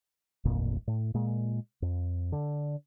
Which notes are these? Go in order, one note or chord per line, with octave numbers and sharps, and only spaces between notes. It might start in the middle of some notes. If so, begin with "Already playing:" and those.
D1 G#1 F2 A#2
A2
A#2 G#3
F2
D3